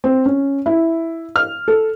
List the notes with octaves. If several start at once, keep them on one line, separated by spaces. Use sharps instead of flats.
C4
C#4
E4
F6
A4